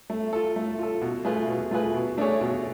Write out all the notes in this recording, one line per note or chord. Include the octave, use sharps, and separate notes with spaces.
A3
F4 A4
A3
F4 A4
B2
A3 F4 G#4 B4
B2
A3 F4 G#4 B4
B2
A3 D4 G#4 C#5
B2